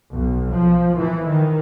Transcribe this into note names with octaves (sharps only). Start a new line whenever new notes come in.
B1
F3
E3
D#3